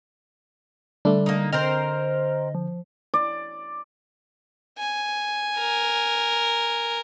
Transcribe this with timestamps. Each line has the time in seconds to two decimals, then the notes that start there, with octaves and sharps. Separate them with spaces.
1.05 D3 G3 A3 D4
1.26 A#3 D#4
1.53 C4 A#4 C5 D#5 F6
2.55 F3
3.14 D5
4.78 G#5
5.58 A#4